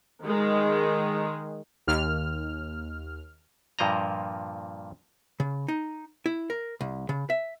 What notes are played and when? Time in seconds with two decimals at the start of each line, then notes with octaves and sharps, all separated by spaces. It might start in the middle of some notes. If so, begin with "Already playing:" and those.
0.25 D#3 G#3
1.87 D#2 F6
3.79 G2 A#2 F3 A#3 D#5 A#5
5.40 C#3
5.68 D#4
6.26 E4
6.50 A#4
6.81 C2
7.09 C#3
7.30 E5